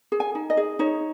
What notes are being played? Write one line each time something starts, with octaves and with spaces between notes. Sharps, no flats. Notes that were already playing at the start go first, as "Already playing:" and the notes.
G#4
G#5
D#4
D#5
G#4
D#4 C#5